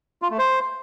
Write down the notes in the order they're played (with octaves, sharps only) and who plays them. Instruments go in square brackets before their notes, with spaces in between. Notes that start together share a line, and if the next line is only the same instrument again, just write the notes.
[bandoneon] F4
A3
C5